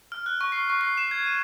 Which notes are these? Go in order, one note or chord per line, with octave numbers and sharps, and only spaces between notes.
F6
F#6
C#6
C7
C#6
C7
E7
G#6
D#7